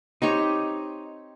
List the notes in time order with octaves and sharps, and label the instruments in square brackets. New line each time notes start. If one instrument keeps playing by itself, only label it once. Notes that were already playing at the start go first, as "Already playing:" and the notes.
[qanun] C4 G4 C#5 [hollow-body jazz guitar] D#4